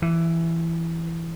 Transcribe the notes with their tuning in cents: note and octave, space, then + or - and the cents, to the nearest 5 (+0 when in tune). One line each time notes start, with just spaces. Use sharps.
E3 +10